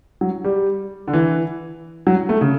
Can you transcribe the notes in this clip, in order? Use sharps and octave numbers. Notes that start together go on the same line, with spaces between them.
F#3
G3
D3
E3
F#3
A3
C#3